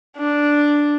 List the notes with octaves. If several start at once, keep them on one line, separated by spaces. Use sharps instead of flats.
D4